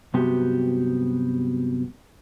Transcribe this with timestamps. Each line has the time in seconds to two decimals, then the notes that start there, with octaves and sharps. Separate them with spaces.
0.14 G2 C3 F#3 B3 F#4 G4